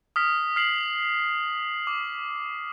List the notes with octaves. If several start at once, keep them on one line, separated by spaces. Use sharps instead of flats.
D#6 F6 B6
F6 C7 F#7
D6